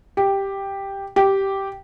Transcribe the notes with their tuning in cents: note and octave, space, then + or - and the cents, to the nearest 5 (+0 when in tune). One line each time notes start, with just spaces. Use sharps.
G4 +0
G4 -10